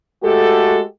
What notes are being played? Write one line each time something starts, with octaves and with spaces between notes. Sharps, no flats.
G#3 A3 F#4 G4 A4